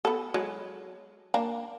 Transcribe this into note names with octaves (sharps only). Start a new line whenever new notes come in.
B3 A4
F#3 G#3
A#3 D4